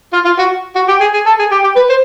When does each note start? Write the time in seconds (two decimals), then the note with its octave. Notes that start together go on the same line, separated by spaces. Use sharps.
0.13 F4
0.25 F4
0.39 F#4
0.75 F#4
0.88 G4
1.00 G#4
1.14 G#4
1.26 A4
1.39 G#4
1.51 G4
1.64 G4
1.76 B4
1.89 C5